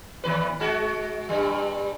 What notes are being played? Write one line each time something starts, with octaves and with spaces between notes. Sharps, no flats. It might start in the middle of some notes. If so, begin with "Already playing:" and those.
D#2 B4
G#3 F#4
G2 G3